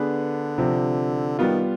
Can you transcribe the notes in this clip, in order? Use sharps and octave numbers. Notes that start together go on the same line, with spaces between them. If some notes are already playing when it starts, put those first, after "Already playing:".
Already playing: D3 B3 D4 G#4 B4
C3 F3 C4
D#3 G3 B3 F4